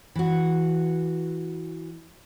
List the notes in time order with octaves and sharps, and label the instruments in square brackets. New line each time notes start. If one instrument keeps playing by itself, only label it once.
[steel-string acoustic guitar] E3 F#4